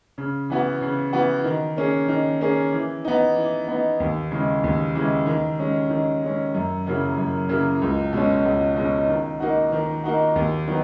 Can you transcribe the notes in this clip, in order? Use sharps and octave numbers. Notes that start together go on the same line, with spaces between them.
C#3
E3 B3 F#4
C#3
E3 B3 F#4
D#3
A#3 C#4 G#4
D#3
A#3 C#4 G#4
E3
B3 D#4
E3
B3 D#4
D#2
C#3 E3 G#3
D#2
C#3 E3 G#3
D#3
G#3 C#4
D#3
G#3 C#4
F#2
C#3 F#3 A#3 E4
F#2
C#3 F#3 A#3 E4
C#2
B2 G#3 C#4
C#2
B2 G#3 C#4
D#3
A#3 D#4 F#4
D#3
A#3 D#4 F#4
D#2
D#3 F#3 B3